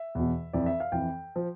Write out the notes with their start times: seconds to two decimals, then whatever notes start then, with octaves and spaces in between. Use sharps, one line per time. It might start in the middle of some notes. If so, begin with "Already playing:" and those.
Already playing: E5
0.15 E2 B2
0.53 F2 E3 D5
0.66 E5
0.80 F5
0.92 F2 E3 G5
1.36 F3